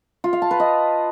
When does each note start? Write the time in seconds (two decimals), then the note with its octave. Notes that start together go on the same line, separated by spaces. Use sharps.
0.24 F4
0.33 F5
0.42 A5
0.51 B4
0.60 D#5